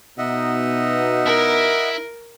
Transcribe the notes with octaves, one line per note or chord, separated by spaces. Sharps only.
B2 D#4 D#5 E5 F#5
E4 A#4